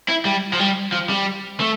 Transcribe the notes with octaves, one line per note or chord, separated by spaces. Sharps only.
E4
G3
F3
G3
F3
G3
A3